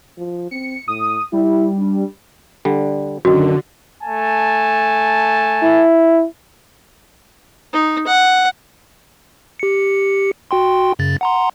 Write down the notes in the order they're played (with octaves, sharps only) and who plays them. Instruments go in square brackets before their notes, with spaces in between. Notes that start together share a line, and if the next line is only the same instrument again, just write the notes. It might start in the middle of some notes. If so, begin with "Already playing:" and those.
[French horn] F3
[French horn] C4 [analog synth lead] C#7
[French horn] A2 [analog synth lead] D#6
[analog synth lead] G3 [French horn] E4
[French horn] D4
[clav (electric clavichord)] D3 G3
[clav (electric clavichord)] F#2 D#3 [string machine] D3 [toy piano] F#4
[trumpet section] A3 G#5 A5
[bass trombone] E4
[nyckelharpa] D#4
F#5
[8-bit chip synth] G4 C#7
F#4 G5 C6
F#2 C#3 A6
F#5 A#5 C6